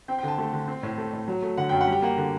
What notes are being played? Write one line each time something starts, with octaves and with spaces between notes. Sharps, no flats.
C4 G5
G5
D3 A5
A3
D3
C4
A2
A3
A2
F#3
A3
D3 F#5
F#2 G5
F#5
G3 G5
A#3 F#5
D3